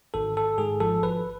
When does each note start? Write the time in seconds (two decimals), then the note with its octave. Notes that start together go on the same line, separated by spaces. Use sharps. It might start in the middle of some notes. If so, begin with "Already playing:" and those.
0.14 G#1 A4
0.36 G#1 A4
0.58 G#2 G#4
0.80 F3 A4
1.03 G#1 B4